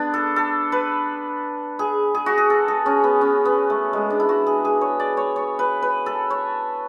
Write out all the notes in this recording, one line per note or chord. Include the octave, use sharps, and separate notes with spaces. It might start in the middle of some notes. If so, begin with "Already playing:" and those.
Already playing: B3 D4
A4
A4
B4
G#4
G#4
F#4
G#4
A4
G#4
C#4
B3
C#4
B3
A3
G#3
D4
E4
F#4
G#4
G#4
C#5
D5
C#5
C#5
B4
B4
A4
C#5